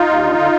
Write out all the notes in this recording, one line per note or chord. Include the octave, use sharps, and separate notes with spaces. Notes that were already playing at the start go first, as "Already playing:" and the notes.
Already playing: D#4 F4
D#2
D3
D3